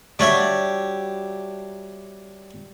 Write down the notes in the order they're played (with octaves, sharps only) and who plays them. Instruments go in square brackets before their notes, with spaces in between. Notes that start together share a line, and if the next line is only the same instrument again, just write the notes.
[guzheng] G3 F#4 [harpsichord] D4 C#5 E5